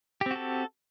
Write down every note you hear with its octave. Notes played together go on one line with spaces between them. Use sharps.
C4 F#4 G4 A4